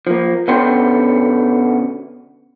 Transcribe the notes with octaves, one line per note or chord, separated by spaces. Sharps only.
F3 A#3
B2 D3 B3 C#4 G5 C6